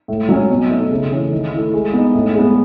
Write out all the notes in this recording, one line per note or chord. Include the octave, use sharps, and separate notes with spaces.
A2
F#3 C#4
B2
A3 D#4 A4
C#3
E3 A3 C#4
D#3
A3 E4
G#3
B3 D#4
A2
G#3 B3